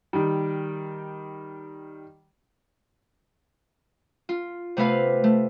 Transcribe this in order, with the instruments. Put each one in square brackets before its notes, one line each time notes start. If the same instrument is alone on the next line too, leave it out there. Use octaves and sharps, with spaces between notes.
[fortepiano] D#3 G3
[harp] F4
C3 A3 B3 B4 F5
A3